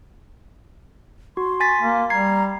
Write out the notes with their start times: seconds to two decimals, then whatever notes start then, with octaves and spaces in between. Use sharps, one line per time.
1.37 F#4 C6
1.60 G#5 A6 B6
1.82 A#3
2.10 G3 A#5 G#6 C7